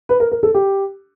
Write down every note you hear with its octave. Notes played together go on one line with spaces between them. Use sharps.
B4
A#4
A#4
A4
G4